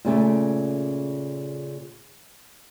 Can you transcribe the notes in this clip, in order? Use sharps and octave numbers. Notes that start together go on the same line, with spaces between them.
A#2 C#3 A3